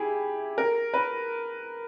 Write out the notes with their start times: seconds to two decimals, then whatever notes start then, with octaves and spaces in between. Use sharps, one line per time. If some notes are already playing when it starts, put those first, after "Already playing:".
Already playing: E4 G4 G#4
0.58 A#4
0.94 B4